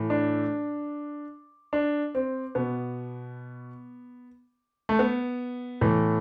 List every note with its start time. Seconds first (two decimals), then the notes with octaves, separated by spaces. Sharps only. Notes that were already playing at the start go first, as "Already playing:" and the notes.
Already playing: A2 E3
0.10 D4
1.73 D4
2.15 C4
2.55 B2 B3
4.89 A3
4.99 B3
5.81 A2 E3